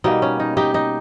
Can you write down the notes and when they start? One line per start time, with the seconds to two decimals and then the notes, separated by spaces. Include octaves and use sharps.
0.04 B2 G3 A#3 D#4
0.22 C#4
0.40 D#4
0.57 D#4 G4
0.74 D#4